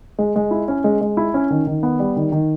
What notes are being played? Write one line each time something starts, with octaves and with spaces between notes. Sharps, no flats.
G#3
G#3
E4
C#4
G#3
G#3
E4
C#4
D#3
D#3
B3
G3
D#3
D#3